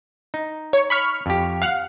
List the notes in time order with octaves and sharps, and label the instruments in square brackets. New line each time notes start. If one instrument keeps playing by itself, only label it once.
[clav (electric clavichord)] D#4
[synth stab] C#5
B5 C#6 F6
[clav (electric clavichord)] F2 G4
[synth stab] F5 F#5